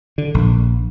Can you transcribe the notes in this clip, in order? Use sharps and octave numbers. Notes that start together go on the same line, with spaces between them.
D3
A#1